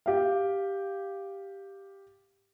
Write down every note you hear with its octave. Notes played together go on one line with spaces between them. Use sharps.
G4 F5